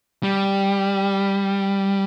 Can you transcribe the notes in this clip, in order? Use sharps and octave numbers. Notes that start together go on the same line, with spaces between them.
G3